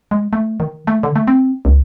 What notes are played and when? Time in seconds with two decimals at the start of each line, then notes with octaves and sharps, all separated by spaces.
0.11 G#3
0.33 A3
0.60 D#3
0.87 A3
1.03 D3
1.16 A3
1.27 C4
1.65 C#2